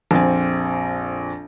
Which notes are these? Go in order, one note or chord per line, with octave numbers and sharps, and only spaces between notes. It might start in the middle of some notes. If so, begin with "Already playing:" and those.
A#1 F2 C4 G#5